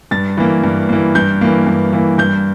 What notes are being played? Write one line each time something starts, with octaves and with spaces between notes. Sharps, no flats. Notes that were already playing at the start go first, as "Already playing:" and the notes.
G2 A6
E3 A#3
G2
E3 A#3
G2 G6
E3 A#3
G2
E3 A#3
G2 G6